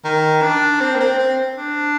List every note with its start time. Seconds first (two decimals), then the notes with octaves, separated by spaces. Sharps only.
0.04 D#3
0.42 D4
0.81 C4
0.95 A#3
1.00 C4
1.18 C4
1.57 D4